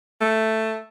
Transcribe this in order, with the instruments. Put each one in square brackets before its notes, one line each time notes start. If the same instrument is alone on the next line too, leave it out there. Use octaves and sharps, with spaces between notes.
[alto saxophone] A3